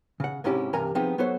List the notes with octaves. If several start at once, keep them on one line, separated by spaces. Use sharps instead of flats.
C#3 F#5
G#2 C3 C#4 E4 G4
G2 C3 E3 A#4 G#5 A#5
F3 B3 C4 D#4 G4 G#4
F#3 B3 A4 C5 C#5